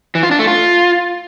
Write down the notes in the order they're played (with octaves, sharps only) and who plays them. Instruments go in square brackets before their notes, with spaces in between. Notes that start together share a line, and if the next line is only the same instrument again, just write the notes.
[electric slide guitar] E3
F4
D4
A3
F4